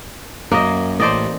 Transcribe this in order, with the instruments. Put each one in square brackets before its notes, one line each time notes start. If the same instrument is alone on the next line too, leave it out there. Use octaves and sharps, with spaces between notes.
[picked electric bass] F#2 [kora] A#3 D#5
[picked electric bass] A1 A2 [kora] C5 D5 D#5